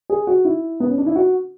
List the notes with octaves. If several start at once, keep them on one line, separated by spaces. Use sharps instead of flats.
G#4
F#4
E4
B3
C#4
D4
E4
F#4